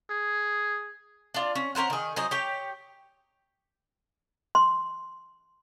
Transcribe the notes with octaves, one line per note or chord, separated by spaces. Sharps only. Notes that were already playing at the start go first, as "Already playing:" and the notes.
G#4
D4 F4
C#4
C#4 A#4 C5 F#5
D#3 G#4
F#3 G#4 C5 D#5
G4 C#5 G5
C6